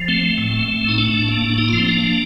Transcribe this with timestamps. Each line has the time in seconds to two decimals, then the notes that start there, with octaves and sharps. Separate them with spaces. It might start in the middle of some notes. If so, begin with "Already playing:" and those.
Already playing: F3
0.08 A3 C4
0.23 A3
0.38 A2
0.53 A3
0.68 A3
0.84 A2 D#4
0.98 A3 D4
1.13 A2
1.29 A#3
1.43 A2
1.50 D4
1.58 A#3 D#4
1.68 F3 F4
1.78 C4
1.88 A#3 D4
2.03 F3